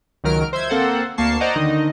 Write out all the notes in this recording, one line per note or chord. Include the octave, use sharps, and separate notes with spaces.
C#2 D#3 F#3 A#4 F6 D7
C5 E5 G#6
A#3 C4 A4 C5 F#5
D2 A#3 A5 C#6 C7
C5 D5 D#5 F#5 G#5 A#5
D3 D#3 D#4 D#5